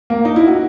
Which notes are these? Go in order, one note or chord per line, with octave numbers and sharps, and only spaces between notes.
A#3
D#4
E4
F#4